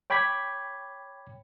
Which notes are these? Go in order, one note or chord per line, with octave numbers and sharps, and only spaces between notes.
C#5 G5 B5 D6 G#6 B6